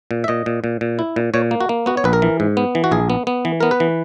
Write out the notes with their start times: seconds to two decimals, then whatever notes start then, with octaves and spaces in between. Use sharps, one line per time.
0.11 A#2
0.24 E5
0.28 A#2 D#5
0.46 A#2
0.64 A#2
0.81 A#2
0.99 E4
1.16 A#2
1.34 A#2 C#5
1.51 A#3
1.60 F#4
1.69 A#3
1.86 B3 F#4
1.97 C#5
2.04 A#1 B4
2.13 A#4
2.22 E3
2.40 G#2
2.57 B3
2.75 E3
2.84 F#4
2.91 A#1 G#4
3.10 B3
3.27 B3
3.45 E3
3.60 B3 A#4
3.71 B4
3.80 E3